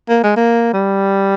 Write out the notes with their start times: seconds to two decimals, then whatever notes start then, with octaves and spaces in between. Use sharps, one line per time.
0.09 A#3
0.23 G#3
0.36 A#3
0.73 G3